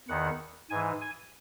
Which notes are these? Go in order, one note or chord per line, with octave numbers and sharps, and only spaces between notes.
E2 D#3 F#5
G#2 E3 G#5
G#5